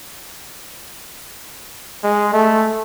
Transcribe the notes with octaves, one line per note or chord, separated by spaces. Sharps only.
G#3
A3